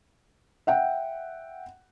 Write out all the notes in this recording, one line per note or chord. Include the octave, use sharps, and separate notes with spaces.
E5 F#5 G5